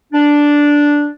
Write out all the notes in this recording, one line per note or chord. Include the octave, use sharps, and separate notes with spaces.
D4